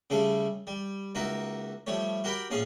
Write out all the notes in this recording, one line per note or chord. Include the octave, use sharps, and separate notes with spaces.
C#3 G3 A3 G#4 A4
G3
C#2 A#3 D#4 F#4 A#4 E5
F3 G3 A3 C#5
F#4 G4 A#4 G5 B5
A#1 A2 C#4 G#4 F5